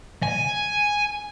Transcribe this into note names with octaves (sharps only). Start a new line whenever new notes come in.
G#5